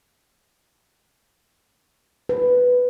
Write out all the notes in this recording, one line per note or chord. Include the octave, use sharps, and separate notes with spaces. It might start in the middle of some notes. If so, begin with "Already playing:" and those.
B4